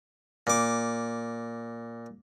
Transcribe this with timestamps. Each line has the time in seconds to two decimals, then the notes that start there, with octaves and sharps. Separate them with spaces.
0.47 A#2 D6